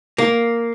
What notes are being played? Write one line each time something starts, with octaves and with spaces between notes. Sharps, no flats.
A#3